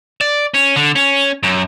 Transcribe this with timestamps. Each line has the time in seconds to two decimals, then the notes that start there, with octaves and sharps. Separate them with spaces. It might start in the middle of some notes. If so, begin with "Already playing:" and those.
0.21 D5
0.54 C#4
0.76 D3
0.96 C#4
1.43 F#2